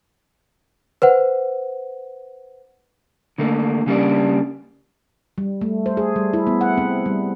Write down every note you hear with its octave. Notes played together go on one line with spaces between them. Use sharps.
B4 C5 F#5
D3 A3 A#3
C#3 G3 A#3 D4
G3
A3
C5
G#4
G3
E4
B3
F#5
C4
G3